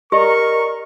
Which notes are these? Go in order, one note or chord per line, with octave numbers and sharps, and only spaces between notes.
G4 A#4 D5 D#5 A#5 C#6